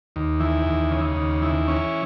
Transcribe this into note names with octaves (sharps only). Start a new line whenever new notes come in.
D#2
E3
D#2
C#3
D#2
E3
C#4